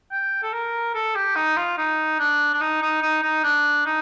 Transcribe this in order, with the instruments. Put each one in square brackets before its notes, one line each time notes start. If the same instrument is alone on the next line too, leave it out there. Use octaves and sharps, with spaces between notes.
[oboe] G5
A4
A#4
A4
G4
D#4
F4
D#4
D4
D4
D#4
D#4
D#4
D#4
D4
D#4